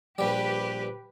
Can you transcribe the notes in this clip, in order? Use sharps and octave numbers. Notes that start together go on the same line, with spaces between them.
A#1 G3 G4 B4